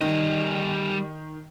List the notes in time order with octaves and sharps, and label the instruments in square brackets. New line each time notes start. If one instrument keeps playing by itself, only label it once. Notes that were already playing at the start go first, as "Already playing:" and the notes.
[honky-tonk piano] D#3 [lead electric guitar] G3 D#5